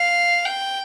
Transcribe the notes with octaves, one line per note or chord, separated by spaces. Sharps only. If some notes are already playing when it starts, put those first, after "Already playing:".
Already playing: F5
G5